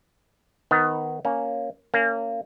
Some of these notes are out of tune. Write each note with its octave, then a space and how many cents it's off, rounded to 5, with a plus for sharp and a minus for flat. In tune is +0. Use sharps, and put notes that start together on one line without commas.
D#3 +0 B3 +20 D#4 +10
A#3 +0 C#4 +0
A#3 -25 C#4 +10